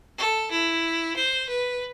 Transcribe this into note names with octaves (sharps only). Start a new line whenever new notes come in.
A4
E4
C5
B4